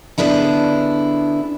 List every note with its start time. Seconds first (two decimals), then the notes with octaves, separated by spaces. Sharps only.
0.18 D3 B3 D4 E4 G#4